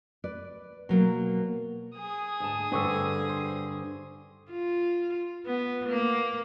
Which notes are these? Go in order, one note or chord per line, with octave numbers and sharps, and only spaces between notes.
B4 D5
B2 F#3 A#3
G#4 D#6
D2 G#2 A5
G2 D3 C4 D4 A4 B4 C#6 E6
C5
F4
B3
A#3